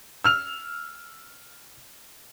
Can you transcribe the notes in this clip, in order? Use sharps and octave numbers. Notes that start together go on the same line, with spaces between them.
E6 F6 F7